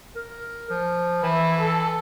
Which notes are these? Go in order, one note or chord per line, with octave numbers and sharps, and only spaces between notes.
A#4
F3
E3 E4
A4